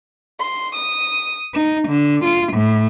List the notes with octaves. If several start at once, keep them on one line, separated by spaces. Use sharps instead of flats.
C6
D#6
D#4
D3
F4
A2